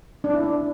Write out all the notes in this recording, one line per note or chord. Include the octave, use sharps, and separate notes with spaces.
D4
E4
D4